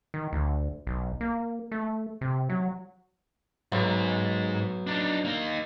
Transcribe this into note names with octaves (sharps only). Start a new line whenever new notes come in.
D#3
D2
B1
A#3
A3
C3
F#3
B1 G#2
D4 D#4
A#3 D#4